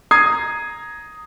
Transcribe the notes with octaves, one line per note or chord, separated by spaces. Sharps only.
A#5 D#6 G#6 C7